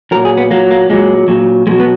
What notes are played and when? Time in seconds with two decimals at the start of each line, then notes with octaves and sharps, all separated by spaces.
0.11 F#3 A#4
0.15 A#2
0.25 G#4
0.37 B3
0.51 A#2 F#3 A#3
0.71 A#3
0.89 A#2 F#3 G#3
1.28 A#2 F#3
1.67 B2 F#3 G#3
1.80 B3